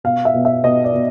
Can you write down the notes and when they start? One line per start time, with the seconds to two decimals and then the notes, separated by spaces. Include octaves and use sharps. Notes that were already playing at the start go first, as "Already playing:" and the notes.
0.04 B2 F5
0.25 E5
0.34 B2
0.45 E5
0.64 B2 D#5
0.84 D5
0.94 B2